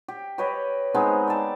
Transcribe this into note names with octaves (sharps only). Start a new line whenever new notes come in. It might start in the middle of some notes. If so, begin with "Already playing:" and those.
G4
G4 B4 C#5 D#5
G#3 B3 C4 D#4
D5 A5